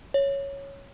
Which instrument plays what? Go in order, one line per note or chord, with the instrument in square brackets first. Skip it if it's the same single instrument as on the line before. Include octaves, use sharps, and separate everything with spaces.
[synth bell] C#5